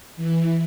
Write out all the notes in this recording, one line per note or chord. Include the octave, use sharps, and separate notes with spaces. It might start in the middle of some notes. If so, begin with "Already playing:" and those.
E3